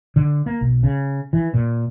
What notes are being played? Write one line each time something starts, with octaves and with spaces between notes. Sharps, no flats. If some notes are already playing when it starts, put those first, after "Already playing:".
D3
A#3
B1
C#3
E3
A#2